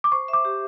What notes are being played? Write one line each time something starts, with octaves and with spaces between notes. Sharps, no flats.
D6
C5 C#6
E5
D6
G4